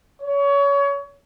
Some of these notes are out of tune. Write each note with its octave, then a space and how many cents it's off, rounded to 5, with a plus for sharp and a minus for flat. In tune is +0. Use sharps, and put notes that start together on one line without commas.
C#5 +25